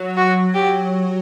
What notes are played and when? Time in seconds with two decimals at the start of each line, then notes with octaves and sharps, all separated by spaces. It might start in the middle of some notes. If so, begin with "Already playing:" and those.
Already playing: F#3
0.17 F#4
0.54 G4